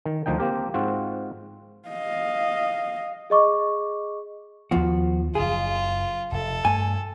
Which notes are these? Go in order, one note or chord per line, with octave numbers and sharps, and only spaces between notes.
D#3
D2 F3 D#4 G5
A#3 C4 G4 A#4
G#2 C4 F4 F#4
D#5 F5
G#4 D#5 C#6 D6
D#2 F3 B3 F#4
F#1 C#3 F4 G#4
F1 A4
G2 A3 G#5